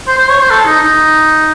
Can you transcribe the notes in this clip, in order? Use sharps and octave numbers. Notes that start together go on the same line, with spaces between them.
C5
C5
C#5
C5
A4
D#4
D#4